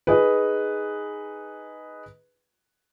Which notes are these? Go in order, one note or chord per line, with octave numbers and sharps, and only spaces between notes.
D#4 G#4 B4